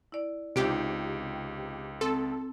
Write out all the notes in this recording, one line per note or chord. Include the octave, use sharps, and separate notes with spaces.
E4 D5
C#2 C3 D#4 F4 G4 D7
C4 A4